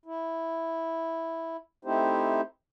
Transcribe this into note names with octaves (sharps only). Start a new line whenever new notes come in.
E4
A3 C4 D#4 E4 G4 C5